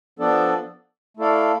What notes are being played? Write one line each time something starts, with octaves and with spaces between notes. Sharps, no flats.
F3 B3 D4 A4 D5
A3 E4 A4 D5 F5